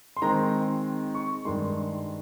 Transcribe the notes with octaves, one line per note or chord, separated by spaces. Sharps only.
C6
D#3 G#3 C4 A#5
C#6
G2 D#3 G#3 C6